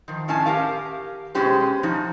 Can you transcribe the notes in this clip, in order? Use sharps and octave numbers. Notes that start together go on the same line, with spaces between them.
D#3 F3
A2 D#3 C#4 G#5 A5
G4 A#4 F5
B2 G#3 C#4 G4 C5
F3 C#4 D#4